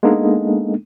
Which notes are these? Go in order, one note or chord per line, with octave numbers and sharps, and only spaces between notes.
G#3 A#3 B3 D4 D#4 A4